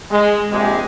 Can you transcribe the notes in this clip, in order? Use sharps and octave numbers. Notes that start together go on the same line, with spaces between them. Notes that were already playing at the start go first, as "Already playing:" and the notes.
G#3
A#1 C3 G#3 G4 G#4